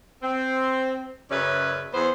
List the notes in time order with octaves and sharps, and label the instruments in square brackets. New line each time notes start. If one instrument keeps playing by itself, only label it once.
[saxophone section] C4
F#2 C#3 C#4 B4 D5 E5
E2 B3 C5